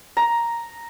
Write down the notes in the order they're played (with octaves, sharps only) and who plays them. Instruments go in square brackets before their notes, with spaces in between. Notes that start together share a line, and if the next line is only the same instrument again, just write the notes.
[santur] A#5